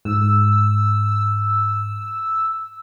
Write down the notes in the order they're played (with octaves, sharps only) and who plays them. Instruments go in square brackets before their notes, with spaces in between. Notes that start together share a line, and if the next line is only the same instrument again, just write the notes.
[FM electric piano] G#2 [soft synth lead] E6